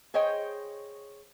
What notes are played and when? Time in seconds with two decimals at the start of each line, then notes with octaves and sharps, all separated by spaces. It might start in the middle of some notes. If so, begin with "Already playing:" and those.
0.14 G#4 C5 C#5 D#5 G5